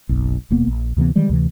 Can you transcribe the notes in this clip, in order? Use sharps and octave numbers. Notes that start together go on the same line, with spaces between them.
F#1 B1
D#1 B2 A#3 B3
A#1
D2 C3 E3 B3
D#3 E3 G3 G#3
D2 C3 E3